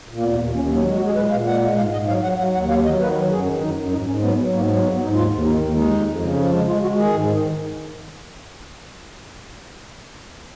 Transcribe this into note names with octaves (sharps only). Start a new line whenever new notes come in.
A#2
A#3
D#2 B3
A#3
D#2
D#2 C#4
C#4
F#3
D#4
G#3
F#4
G#3 G#4
A#2 B4
A#2 F5
G#3 F#5
G#3
G#2 F5
G#2 D#5
F#3 F5
F#3 F#5
F#3 F#5
D#2 F#5
F#3 F5
F#3 D#5
D#3 B4
F#3
F#2 G#4
D#3
F#2 D#4
F#2
G#2 D#4
G#2 C#4
F#3 B3
F#3
G#2 A#3
F#3
G#2 B3
G#2
D#4
D#2 F4
D#2
D#3 D#4
D#2
G#3 D#4
F2
F2
C#3
F3
G#3
G#3 F4
G#3 F#4
D#3 G#4
G#2
D#3